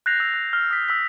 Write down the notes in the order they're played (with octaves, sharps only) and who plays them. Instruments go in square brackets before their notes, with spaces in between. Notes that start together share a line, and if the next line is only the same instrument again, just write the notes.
[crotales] F#6 G6 A6 A#6 C7 F7
E6 F#6 A#6 F7
F#6
F6
D#6 B6
E6 F#6 B6